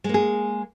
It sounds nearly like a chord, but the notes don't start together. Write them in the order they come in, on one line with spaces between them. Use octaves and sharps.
G#3 A#3 G#4